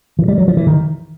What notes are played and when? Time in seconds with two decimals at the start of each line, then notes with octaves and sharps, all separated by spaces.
0.19 E3
0.28 G3
0.38 F#3
0.48 F3
0.57 E3
0.67 D#3